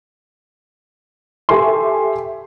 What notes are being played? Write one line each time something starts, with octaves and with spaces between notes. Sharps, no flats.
G4 A4 E5 G#5 C6